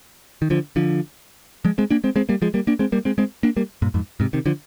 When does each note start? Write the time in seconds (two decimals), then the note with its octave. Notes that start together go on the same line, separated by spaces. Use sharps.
0.42 D#3
0.50 D3 F3
0.76 D3 F3
1.65 F3 G#3
1.78 G#3 C4
1.91 A#3 D4
2.04 G#3 C4
2.16 G#3 C4
2.29 G3 A#3
2.42 F3 G#3
2.54 G3 A#3
2.67 A#3 D4
2.79 G#3 C4
2.92 G3 A#3
3.05 G#3 C4
3.18 G#3 C4
3.43 A#3 D4
3.56 G3 A#3
3.82 G2 A#2
3.94 F2 G#2
4.20 G#2 C3
4.33 C3 D#3
4.46 D3 F3